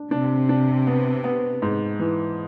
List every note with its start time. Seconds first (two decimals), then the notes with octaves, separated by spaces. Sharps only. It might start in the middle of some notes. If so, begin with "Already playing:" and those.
Already playing: D4
0.11 C3 D4
0.49 D4
0.87 B3
1.24 B3
1.62 G#2
2.00 E3